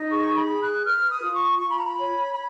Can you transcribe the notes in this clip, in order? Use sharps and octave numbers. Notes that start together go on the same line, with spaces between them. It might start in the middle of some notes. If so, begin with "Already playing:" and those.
Already playing: D#4
G#4 C#6
B5
G#4
F#6
B4 F6
D#6
F4
C#6
F4 C#6
B5
A#5
B5
C#5
B5